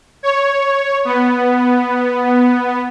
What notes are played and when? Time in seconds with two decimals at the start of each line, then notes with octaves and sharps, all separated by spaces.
0.23 C#5
1.05 B3